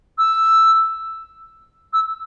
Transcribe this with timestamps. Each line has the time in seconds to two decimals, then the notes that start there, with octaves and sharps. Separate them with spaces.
0.18 E6
1.93 E6